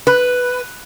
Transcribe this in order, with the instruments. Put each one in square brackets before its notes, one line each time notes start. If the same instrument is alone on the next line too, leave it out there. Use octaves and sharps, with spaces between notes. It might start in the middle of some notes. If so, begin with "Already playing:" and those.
[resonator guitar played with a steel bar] B4